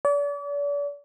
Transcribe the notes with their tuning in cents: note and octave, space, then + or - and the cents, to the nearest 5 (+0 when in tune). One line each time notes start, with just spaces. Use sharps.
D5 -40